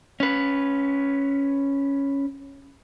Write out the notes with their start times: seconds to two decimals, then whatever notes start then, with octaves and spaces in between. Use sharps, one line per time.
0.20 C#4 B4